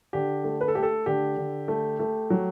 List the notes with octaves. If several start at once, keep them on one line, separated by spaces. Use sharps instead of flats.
D3 G4
A3
B4
A4
A3 G4
A4
D3 G4
D3
A3
A3
F#3